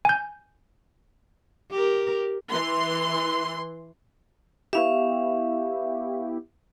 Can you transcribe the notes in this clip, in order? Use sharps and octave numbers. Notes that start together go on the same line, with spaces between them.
G#5 G6
G4 A#4
E3 C6
B3 E4 G4 E5 F5 C#6